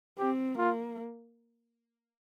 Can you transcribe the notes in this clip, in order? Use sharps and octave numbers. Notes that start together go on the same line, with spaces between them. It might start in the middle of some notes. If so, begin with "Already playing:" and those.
C4 G4
A#3 F4